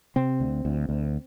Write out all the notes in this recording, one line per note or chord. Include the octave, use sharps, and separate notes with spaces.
C3 C4
D2
D2
D2